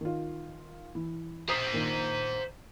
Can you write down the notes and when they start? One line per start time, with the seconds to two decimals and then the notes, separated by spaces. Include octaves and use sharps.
0.01 D#3 F4
0.95 E3
1.49 C5 A#5 D#6 B6 C7
1.72 A#2 D#3